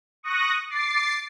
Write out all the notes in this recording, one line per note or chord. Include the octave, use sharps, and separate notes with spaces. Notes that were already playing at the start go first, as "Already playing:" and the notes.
C#6 D#6 F#6 A#6
D6 A6 C7